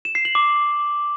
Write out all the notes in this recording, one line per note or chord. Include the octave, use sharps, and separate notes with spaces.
E7
C7
F#7
D6